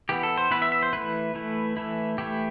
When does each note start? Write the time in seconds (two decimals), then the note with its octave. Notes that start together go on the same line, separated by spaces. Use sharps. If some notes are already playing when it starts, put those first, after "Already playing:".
0.09 E3 B3 E4 G4
0.23 A4
0.37 C5
0.51 E3 B3 E4 B4
0.62 E5
0.72 E5
0.83 C5
0.93 E3 A3 E4 B4
1.34 E3 A3 E4
1.77 E3 A3 E4
2.18 E3 A3 E4 G4